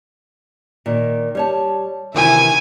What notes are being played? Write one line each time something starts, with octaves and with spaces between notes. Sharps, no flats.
A#2 D#3
G3 C#5 A5
C3 D#3 E3 E4 G#5